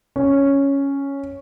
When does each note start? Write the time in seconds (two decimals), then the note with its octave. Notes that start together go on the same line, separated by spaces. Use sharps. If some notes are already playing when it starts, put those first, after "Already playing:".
0.16 C#4